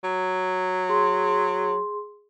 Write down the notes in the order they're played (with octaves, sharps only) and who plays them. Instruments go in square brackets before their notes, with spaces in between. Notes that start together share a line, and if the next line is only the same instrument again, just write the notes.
[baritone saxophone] F#3
[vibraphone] G#4 C6